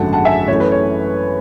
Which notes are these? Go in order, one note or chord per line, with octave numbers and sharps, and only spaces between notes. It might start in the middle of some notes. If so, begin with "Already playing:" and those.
Already playing: G#1 F#2 D3 F#3 A3 F#5 A5
F#5 A5
E5 G#5
F#2 E3 A3 C#5
B4
C#5